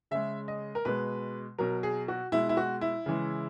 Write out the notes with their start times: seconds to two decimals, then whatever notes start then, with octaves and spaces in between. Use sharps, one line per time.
0.11 C#3 G#3 E5
0.48 D#5
0.75 A#4
0.85 B2 G#3 B4
1.58 B2 F#3 A#4
1.83 G#4
2.08 F#4
2.32 B2 G#3 E4
2.49 E4
2.57 F#4
2.81 E4
3.06 C#3 E3 G#3